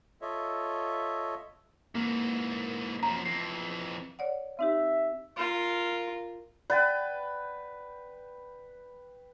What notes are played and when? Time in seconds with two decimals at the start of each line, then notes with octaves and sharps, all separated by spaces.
0.21 F4 A4 C#5 D#5 E5
1.95 G#2 E3 A#3
3.03 F#2 F3 A#5
3.25 F2 E3 C7
4.19 C#5 D5 F#5
4.59 C4 D#4 G4 E5
5.37 F4 A#4
6.70 B4 D5 F#5 G5 A6